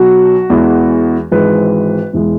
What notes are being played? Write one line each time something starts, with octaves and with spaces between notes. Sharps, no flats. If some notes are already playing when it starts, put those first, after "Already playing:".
Already playing: B1 B2 F#3 F#4
E2 E3 G#3
G#1 G#2 E3 G#3 B4
E1 E3 G#3